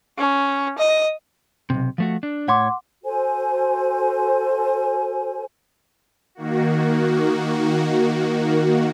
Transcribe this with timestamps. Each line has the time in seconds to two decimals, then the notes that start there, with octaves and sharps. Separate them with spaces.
0.18 C#4
0.78 D#5
1.70 B1 G#2 C3
1.98 F3 A3 F#4
2.23 D4
2.48 A2 C#5 F#5 C6 D6
3.04 F#4 A4 C5 G#5
6.35 D#3 A#3 F#4